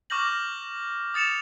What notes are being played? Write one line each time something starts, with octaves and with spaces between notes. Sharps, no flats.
C#6 D6 F6 G6 A#6 F#7
D#6 A6 C#7 E7 F7